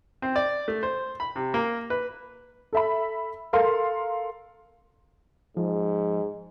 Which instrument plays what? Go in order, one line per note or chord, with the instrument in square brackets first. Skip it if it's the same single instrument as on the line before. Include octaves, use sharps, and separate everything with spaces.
[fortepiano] C4
D5
A3
C5
B5
C3
A#3
B4
[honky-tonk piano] A4 E5 B5
A4 A#4 F5 C6
[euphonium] G#2 [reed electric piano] F3